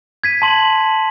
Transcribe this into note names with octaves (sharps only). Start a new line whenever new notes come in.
G#6 B6 D#7
A5 C6 F#7